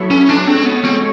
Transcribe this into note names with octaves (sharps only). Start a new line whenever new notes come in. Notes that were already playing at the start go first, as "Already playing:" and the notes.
Already playing: F#3 B3 E4 A4 C#5
C#4
D4
G#3 C4 C#4 F#4 A4 C#5
B3
C4